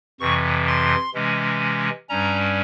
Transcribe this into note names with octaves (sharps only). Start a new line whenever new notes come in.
F2 C3 E3 C#6
C6
C3 E3 G#3 C#4
G2 G3 C#4 A#5